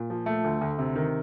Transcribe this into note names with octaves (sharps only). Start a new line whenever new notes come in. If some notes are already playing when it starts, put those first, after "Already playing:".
Already playing: A#2
F3
A3
D2
D2
C3
D#3